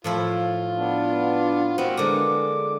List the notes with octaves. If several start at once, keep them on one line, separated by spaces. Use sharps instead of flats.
A2 F3 E4 F4
B3 D4
B3 C4 F#4 F5
D3 G#3 A#3 A#5 D6